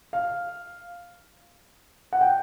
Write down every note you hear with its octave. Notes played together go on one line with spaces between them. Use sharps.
F5
F#5
G5